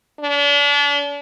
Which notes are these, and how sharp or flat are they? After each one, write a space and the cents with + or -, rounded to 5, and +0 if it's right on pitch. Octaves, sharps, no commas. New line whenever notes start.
D4 -40